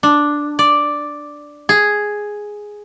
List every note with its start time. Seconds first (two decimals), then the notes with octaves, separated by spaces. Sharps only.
0.03 D4
0.59 D5
1.69 G#4